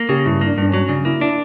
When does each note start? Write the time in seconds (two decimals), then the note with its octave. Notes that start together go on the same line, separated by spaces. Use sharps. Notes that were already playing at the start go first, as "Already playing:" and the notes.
Already playing: A#3
0.09 C#3 G4
0.25 G2 E4
0.41 A#3
0.47 D4
0.58 G2 D4
0.69 F#3 C#4
0.89 C#3 D4
1.05 A#3 E4
1.21 D4 E4